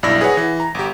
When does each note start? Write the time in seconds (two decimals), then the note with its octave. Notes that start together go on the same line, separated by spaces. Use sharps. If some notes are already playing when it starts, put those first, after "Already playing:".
0.03 B1 G2 E4 D5 E6 A#6
0.21 G#4 B4 C#5 F#5
0.37 E3
0.60 A#5
0.75 G1 G4